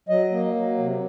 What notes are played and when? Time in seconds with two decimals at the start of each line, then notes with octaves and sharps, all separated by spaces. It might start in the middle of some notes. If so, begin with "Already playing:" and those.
0.09 F#3 D#5
0.32 A#3
0.55 F#3
0.78 C3